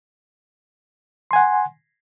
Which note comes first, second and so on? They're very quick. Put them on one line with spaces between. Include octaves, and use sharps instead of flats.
C6 G#5 F#5